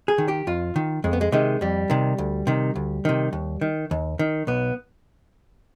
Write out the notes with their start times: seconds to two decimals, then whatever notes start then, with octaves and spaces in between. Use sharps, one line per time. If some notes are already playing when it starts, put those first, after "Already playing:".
0.08 G#4
0.18 D#3
0.28 G4
0.47 F2 F4
0.76 D#3
1.04 F2 G#3
1.13 B3
1.21 G#3
1.32 C3 D#3 G#3
1.61 F2 G3
1.90 C3 D#3
2.18 D2
2.47 C3 D#3
2.75 D2
3.05 C3 D#3
3.33 D#2
3.61 D#3
3.91 D#2
4.19 D#3
4.47 B1 B3